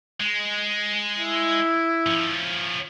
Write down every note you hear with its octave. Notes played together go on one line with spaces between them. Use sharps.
G#3
E4
F3 C#4